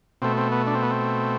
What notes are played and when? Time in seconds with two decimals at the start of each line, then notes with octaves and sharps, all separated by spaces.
0.22 B2 A3 C4
0.37 C4
0.52 B3
0.67 D4
0.75 C4
0.83 B3
0.91 C4